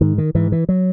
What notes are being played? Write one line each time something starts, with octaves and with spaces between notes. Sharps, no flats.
G#2 D#3
D#3
G#2 E3
E3
F#3